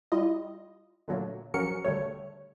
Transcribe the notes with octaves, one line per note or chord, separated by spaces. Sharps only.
G3 E4 F4 D#5
A#2 D3 F#3 A3 A#3
F3 F#3 C#4 F#4 A#4 C#7
D3 G3 A3 C#5